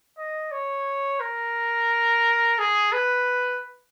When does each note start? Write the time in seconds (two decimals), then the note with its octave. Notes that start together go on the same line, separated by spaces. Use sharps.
0.18 D#5
0.52 C#5
1.20 A#4
2.59 G#4
2.92 B4